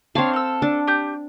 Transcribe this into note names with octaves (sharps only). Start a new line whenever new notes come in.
C4 D4 C#5 F5 C6
A4 E6
D4
G4 G6